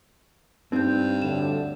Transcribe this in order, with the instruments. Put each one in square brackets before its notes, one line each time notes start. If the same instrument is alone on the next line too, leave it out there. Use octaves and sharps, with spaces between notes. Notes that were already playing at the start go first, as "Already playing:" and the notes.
[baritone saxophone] G2 [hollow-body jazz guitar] C4 [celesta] D#4 G6
[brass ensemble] D2 A2 D3 [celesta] E7